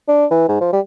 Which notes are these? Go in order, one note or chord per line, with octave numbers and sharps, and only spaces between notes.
D4
E3
G#2
F3
G3